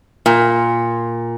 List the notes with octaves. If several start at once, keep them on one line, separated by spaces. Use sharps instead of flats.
A#2